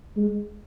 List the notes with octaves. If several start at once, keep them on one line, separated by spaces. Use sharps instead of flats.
G#3